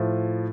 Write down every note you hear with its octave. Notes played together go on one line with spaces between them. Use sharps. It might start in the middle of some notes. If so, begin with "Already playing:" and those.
Already playing: A2 F3